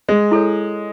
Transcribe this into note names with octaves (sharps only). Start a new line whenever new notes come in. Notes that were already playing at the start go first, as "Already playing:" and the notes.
G#3
E4 A4 C#5